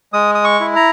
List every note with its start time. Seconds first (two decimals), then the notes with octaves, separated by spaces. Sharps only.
0.13 G#3 D#6
0.35 D#6
0.44 C#6
0.60 E4
0.76 A#5